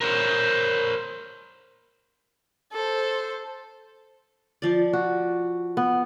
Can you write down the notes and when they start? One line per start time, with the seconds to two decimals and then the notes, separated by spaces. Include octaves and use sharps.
0.01 A#4 C5 C#5
2.72 A4 C5
4.62 F3 D5
4.93 F#4
5.77 B3